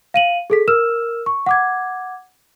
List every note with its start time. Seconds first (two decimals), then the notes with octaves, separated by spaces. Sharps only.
0.14 F5 D#7 F#7
0.50 G#4 A4 B6
0.68 A#4 E6 F6 E7
1.26 C#6
1.46 F#5 D6 G#6